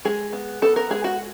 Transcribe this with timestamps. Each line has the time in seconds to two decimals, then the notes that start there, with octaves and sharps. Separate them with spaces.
0.05 G#3 G#4
0.33 B3
0.62 B3 A4
0.76 A#4
0.90 G#3 G#4
1.04 F#4